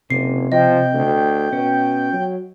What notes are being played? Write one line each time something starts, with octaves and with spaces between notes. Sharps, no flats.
F#1 C3 C7
F3 D#5 G5
D2
B2 C#4
F#3